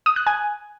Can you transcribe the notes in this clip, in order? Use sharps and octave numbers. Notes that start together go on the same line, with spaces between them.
D#6
F#6
G#5